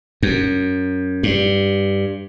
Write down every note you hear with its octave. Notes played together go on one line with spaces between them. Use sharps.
F#2
G2